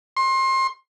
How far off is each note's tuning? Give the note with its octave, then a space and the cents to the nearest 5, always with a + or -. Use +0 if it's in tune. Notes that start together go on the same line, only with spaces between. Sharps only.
C6 +25